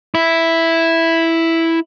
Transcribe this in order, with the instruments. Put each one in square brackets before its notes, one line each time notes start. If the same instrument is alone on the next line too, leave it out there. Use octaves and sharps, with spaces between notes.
[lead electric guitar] E4